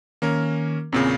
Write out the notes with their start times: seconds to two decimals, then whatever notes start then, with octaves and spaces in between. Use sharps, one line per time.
0.22 D#3 A#3 C#4 A#4
0.92 E2 A#2 C#3 C4